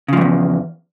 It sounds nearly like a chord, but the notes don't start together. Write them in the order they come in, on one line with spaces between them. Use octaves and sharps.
C#3 F3 G#2 E2